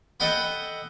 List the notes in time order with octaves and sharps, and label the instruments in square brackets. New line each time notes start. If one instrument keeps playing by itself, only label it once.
[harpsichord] A4 D#5 F#5 G5 B5